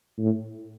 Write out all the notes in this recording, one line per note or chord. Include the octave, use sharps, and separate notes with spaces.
A2